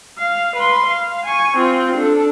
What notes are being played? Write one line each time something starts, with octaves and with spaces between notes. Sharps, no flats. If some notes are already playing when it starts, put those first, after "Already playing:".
F5
B4 C6
F5
G#5 C#6
C4 F4
D4 A4